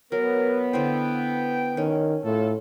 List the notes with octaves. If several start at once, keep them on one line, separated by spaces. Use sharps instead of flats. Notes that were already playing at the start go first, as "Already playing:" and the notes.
F#3 B3 A#4
D3 E4 C5 G5
D#3 C#4
A2 A3 F4 A4